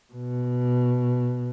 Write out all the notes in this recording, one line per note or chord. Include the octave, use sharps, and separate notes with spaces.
B2